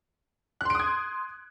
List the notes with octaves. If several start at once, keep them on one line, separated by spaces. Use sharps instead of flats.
C6 D#6 F#6 G#6 D7